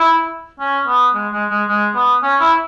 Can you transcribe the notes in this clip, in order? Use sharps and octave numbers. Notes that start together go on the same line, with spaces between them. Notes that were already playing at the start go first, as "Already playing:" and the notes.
Already playing: E4
C#4
B3
G#3
G#3
G#3
G#3
B3
C#4
E4